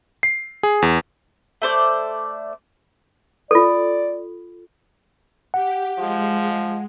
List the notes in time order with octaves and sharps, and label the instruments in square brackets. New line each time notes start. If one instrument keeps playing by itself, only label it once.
[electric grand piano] C7
G#4
E2
[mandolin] A3 C5 D5
[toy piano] F4 A4 [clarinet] D5
[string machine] G4 [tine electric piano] F#5
[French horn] F3 [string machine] G#3